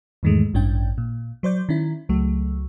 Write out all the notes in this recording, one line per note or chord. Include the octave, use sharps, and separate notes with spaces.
E2 G#2 D#3 E3 G#3 A3
A1 G2 C#4 D4 G5
A#2
F#3 C5 D5 G6
D#3 C#4 E4
C#2 F#3 A3